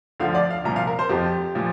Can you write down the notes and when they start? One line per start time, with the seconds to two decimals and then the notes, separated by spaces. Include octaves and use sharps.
0.20 D2 D3 F3 F5
0.34 D5
0.50 F5
0.64 C2 A#2 F3 A#5
0.76 F5
0.87 A#4
0.99 C5
1.09 F2 F3 G4
1.55 A#2 F3